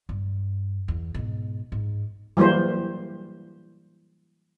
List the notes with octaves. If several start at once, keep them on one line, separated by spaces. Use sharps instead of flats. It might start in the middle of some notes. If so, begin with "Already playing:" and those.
G2
E2
G#2 B2
G#2
E3 F#3 G3 A#3 C5